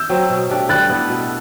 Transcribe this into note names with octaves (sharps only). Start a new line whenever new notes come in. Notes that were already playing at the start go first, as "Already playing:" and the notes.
Already playing: E6 G6
F#3 C4
B2
A3 D4 G4
G3 F#6 A6
B3 E4 A4
B2